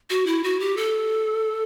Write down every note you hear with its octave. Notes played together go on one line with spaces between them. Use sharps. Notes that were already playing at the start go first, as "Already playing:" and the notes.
F#4
E4
F#4
G4
A4